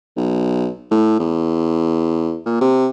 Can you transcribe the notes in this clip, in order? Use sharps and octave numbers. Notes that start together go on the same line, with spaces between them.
B1
A2
E2
A#2
C3